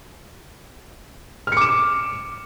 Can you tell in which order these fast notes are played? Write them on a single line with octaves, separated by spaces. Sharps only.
F6 C#7 D6 E7